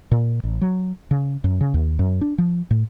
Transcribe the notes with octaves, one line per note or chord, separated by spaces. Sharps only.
A#2
A1
F#3
C#3
F#2
C#3
D#2
F#2
D4
F3
A2